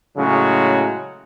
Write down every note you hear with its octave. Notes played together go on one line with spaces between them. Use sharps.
A2 C#3 F#3 G#3